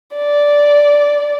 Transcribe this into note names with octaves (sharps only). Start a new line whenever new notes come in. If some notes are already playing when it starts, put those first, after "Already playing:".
D5